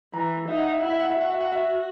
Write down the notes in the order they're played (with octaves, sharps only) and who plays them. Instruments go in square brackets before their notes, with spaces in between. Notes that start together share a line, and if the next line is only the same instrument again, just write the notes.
[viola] E3 [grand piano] A#5
[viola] D#4 [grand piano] E5
[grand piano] F#5
E5
[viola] E4 [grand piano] F#5
[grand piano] E5
F#5
E5
[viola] F#4 [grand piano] F#5
[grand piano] E5
F#5
E5